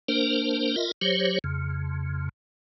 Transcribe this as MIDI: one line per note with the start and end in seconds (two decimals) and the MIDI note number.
0.08 0.76 58
0.08 0.76 62
0.08 0.76 70
0.08 0.76 72
0.76 0.91 65
0.76 0.91 70
0.76 0.91 75
0.76 0.91 76
1.01 1.39 54
1.01 1.39 67
1.01 1.39 72
1.01 1.39 73
1.44 2.29 41
1.44 2.29 49